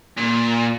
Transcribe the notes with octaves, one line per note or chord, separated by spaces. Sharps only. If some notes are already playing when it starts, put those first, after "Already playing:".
A#2